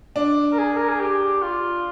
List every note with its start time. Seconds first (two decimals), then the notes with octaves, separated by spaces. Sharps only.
0.16 D4
0.52 A#4
0.58 G#4
0.76 A#4
0.88 G#4
1.00 G4
1.42 F4